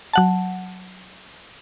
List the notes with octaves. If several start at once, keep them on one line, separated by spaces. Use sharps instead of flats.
F#3 F#5 A5